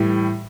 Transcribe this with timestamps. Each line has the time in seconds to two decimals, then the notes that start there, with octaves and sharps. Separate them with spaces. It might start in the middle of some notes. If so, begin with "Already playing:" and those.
Already playing: A2 E3 G3